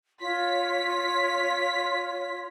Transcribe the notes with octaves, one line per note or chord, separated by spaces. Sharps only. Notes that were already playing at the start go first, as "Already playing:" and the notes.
F4 C#5 C6 B6